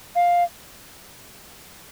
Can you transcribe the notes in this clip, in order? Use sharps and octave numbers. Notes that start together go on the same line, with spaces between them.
F5